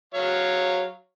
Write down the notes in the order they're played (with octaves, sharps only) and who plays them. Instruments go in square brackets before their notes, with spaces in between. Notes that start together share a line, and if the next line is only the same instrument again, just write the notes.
[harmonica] F#3 C#5 F5